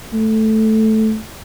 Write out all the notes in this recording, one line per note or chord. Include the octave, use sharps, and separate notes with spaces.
A3